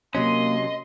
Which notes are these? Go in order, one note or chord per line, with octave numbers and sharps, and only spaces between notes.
C3 F#3 A#3 C#4 D#5 C6